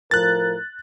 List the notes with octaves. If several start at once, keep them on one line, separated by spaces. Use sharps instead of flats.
A2 F3 A#4 F#6 A6